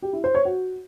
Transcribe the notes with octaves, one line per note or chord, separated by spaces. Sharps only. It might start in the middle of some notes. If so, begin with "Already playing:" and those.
G4
E4
C5
C#5
F#4